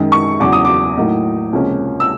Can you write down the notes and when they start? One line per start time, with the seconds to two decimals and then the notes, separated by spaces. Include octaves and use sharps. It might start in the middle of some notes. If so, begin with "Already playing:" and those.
Already playing: F#2 D#3 G#3
0.12 C#6
0.40 E2 C#3 F#3 D6
0.52 D#6
0.65 D6
0.97 A2 F#3 A#3 D#4
1.53 C#2 C3 F3 A#3 C#4
2.00 E6